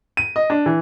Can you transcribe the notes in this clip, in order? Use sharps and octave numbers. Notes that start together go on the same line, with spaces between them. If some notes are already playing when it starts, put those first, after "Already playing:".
D#7
D#5
D4
E3